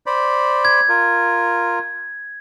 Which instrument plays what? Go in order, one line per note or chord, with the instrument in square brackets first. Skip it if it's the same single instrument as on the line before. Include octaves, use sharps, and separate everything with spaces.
[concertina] C5 D5 B5
[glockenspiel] G#6
[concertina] F4 A#4